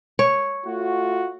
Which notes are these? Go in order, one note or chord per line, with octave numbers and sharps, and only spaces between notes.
C#5
A3 F4 F#4